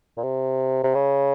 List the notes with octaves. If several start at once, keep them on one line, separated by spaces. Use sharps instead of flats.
A#2
C3
C3
C#3